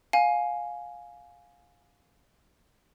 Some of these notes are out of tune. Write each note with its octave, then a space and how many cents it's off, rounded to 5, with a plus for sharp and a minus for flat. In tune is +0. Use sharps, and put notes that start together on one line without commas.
F5 +20 G#5 +10